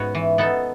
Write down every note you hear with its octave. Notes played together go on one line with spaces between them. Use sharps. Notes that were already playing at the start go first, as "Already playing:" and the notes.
Already playing: G#2 B3 F#4 C#5
E3
B3 D#4 A4